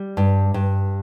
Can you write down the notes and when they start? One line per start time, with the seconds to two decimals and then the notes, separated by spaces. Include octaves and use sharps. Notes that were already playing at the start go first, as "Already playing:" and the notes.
Already playing: G3
0.17 G2
0.54 G2